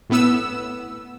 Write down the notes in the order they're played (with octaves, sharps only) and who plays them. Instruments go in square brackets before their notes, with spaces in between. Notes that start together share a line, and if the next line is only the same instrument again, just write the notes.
[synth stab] A2 B3 E6